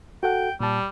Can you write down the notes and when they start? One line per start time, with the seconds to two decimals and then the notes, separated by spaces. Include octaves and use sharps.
0.23 F#4 A4 F#5 G5
0.60 A#2 G3 A5